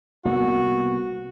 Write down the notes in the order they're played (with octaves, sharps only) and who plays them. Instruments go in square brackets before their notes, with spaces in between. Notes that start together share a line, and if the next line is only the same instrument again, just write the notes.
[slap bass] C2 A#3 B3 [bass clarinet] F#4